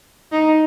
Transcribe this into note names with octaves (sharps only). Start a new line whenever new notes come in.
D#4